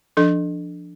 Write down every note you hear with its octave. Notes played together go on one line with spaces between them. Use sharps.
F3 D4 A4